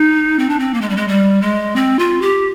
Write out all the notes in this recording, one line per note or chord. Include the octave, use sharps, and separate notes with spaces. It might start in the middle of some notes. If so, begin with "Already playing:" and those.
Already playing: D#4
C4
D4
C4
A#3
G#3
G3
G#3
G3
G#3
C4
F4
G4